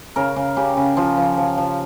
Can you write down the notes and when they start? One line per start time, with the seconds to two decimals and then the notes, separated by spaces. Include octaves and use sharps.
0.16 C#3 A#4
0.36 C#3
0.56 C#3 G4
0.77 C#3
0.97 F3 F4
1.17 F3
1.37 F3
1.58 F3